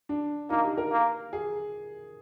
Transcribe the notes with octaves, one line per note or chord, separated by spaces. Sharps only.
D4
A#3 D#4
G4
A#4
A#3
G#4